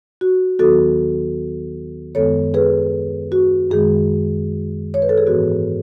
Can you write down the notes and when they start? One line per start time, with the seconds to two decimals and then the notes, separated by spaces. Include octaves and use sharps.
0.21 F#4
0.59 D#2 D#3 F#3 B3 F#4 A4
2.15 F#2 D#3 G#3 B3 A4 C#5
2.54 G#4 B4
3.32 F#4
3.70 F#2 D#3 G#3 G#4
4.94 C#5
5.02 B4
5.09 A4
5.18 G#4
5.26 G#2 E3 B3 F#4